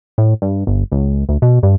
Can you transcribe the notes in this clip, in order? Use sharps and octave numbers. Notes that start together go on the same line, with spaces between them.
A2
G2
G1
C#2
D2
B2
G2